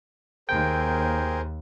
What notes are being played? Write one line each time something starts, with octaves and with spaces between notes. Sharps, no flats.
D#2 G#4 A#4 C5 G5